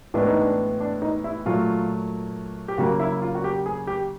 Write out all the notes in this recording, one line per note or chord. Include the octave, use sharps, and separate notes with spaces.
A2 E3 G#3 B3 D4
D#4
D4
D4
D#4
E4
A#2 F#3 A3 F4
G4
C#3 F#3 A#3 F#4
E4
F4
F#4
G4
G#4
G4